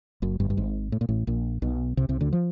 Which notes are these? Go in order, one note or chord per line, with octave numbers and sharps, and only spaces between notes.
F#1 F#2
G1 G2
G2
G#1 G#2
A2
A#2
A1 A2
A#1 A#2
B1 B2
C2 C3
C2 C3
D2 D3
F3